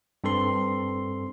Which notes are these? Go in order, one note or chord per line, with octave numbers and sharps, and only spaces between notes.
G2 C4 A4 C6